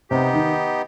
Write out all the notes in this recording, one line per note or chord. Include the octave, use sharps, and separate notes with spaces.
C3 B3 D#4 G4
D#3